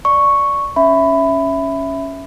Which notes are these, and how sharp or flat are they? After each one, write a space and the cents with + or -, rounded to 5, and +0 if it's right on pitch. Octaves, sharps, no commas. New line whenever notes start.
D5 +0 C#6 +0
C#4 +0 E5 +0 B5 +15